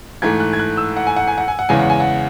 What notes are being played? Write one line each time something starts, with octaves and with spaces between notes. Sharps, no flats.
G#2 E3 A3 G#6
F#6
G#6
F#6
E6
F#5
G#5
F#5
G#5
F#5
G#5
F#5
E2 C#3 E3 G#3 G#5
F#5
G#5
F#5